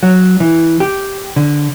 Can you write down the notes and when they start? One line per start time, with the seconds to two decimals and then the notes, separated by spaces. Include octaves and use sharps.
0.03 F#3
0.40 E3
0.80 G4
1.36 D3